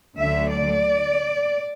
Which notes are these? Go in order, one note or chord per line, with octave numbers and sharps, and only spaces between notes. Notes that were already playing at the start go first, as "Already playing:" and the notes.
D2 D3 F#3 A3 E5
D5